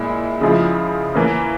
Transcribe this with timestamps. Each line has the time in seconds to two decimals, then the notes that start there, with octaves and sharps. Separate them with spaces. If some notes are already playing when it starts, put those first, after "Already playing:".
Already playing: A#2 G#3 E4
0.41 C#3 F3 G#3 E4
1.15 E3 A#3 C#4